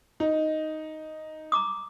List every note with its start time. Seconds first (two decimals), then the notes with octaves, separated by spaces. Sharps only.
0.20 D#4
1.52 A#5 D6 D#6